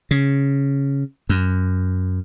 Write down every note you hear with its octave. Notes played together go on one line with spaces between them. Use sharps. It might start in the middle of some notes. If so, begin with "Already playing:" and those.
C#3
F#2